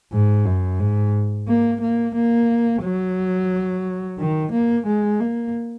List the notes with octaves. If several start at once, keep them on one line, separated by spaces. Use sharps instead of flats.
G#2
F#2
G#2
A#3
A#3
A#3
F#3
D#3
A#3
G#3
A#3